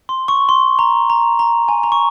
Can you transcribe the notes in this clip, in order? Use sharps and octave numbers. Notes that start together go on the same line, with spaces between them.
C6
C#6
C6
A#5
A#5
A#5
G#5
A#5
C#6